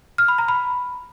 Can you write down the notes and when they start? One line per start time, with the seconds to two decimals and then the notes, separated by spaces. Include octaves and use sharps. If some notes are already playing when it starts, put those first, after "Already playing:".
0.18 F6
0.28 B5
0.38 A#5
0.48 B5